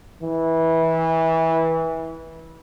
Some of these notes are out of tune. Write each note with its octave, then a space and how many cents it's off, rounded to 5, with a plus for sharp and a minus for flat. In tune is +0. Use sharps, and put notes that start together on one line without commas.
E3 -20